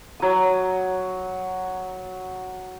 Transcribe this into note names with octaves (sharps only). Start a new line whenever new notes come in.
F#3 D#6